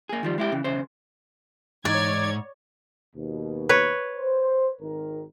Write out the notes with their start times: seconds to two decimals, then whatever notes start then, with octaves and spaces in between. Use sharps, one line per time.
0.09 A#3 G#4
0.23 D#3 F3 G3
0.38 G#3 E4 G4
0.52 C#3 E3
0.64 B1 E2 C#3 C5
1.85 G#2 E3 D#4 C#5 D5 G#6
3.16 D#2 B2
3.69 B4 C#5
4.18 C5
4.81 G#1 D#3 A#4